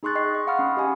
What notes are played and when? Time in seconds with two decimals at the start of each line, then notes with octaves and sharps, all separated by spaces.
0.03 D#4 G#4 C6 C#6 F#6 A6
0.15 D#5 G5 C7
0.35 C#6
0.47 F5 F#5 B5 D#6 F6
0.59 C#4 B5
0.77 G4 D#5 F#5 G#5